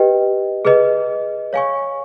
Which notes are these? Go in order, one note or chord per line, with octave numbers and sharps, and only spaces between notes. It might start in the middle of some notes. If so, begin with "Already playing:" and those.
Already playing: G4 B4 D#5 G5
G#4 B4 D#5
C#5 F5 G#5 C#6